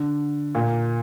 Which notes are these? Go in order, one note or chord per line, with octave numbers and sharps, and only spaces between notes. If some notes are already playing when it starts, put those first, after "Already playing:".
Already playing: D3
A#2